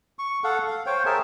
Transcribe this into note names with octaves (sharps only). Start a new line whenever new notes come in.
C#6
A4 F5 F#5
F5
C5 C#5 G5
G#4 A#4 E5 A5